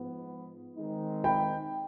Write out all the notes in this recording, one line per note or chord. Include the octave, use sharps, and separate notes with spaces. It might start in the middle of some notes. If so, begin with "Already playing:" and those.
Already playing: G#2 F3 B3
D#3 G#3 C4 D#4
G5 B5